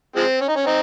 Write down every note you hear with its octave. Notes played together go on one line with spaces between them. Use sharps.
F3 G#3 C4
C#4
D#4
C#4
C4 D#4